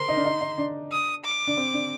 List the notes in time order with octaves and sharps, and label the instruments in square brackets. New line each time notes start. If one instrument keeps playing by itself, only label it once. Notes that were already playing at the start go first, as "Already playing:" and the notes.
Already playing: [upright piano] A#4 C5 [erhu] C6
[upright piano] D#4
D4
D#4
D#4
D4
[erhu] D#6
D6
[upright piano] D4
C4
D4